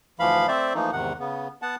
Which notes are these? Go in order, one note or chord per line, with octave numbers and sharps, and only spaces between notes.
D2 E3 F3 F5 B5
A3 C4 C5 D5 E5
E3 F3 A3 A#3 D#4
E2 G#2 C3 D#3 F#5
C#3 B3
B3 F#5 A5